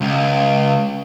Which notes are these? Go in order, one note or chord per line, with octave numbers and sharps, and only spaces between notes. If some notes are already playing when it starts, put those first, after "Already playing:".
C#2